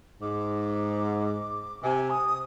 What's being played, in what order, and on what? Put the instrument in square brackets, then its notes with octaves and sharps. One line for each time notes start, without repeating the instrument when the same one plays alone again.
[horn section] G#2 [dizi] D6
[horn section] C3 [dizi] G#5
[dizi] D#6